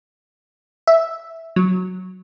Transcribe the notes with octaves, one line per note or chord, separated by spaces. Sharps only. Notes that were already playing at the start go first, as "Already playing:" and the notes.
E5
F#3